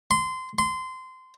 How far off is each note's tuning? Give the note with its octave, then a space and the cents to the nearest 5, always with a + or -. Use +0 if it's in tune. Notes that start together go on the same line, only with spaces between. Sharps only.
C6 -20
C6 -20